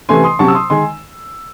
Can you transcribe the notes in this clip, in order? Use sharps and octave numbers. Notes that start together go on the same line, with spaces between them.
C3 E3 A3 C#4 G#5 C6
C6 D#6
C3 F#3 C#4 A5 C#6
E6
C6 D#6
D#3 G#3 D#4 G#5 C6